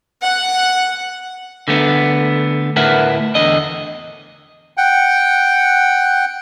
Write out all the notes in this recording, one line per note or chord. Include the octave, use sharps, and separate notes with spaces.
F#5
D3 A3 B3
D2 A2 A#4 B4 E5 F#5
E2 D3 D#5
F#5 G5